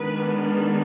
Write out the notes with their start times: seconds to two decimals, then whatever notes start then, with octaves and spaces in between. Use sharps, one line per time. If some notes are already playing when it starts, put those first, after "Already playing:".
Already playing: D#3 G#3 B3 D4 B4